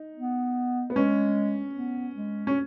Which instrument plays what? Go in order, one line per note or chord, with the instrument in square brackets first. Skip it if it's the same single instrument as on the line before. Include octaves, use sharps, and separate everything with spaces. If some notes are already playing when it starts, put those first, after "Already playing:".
Already playing: [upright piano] D#4
[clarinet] B3
[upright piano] B3
[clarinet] G#3 [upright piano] C#4
[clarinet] B3
G#3
[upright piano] C#4